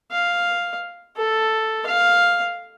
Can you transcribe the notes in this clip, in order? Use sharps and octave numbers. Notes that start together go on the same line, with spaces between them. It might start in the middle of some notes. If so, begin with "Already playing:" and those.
F5
A4
F5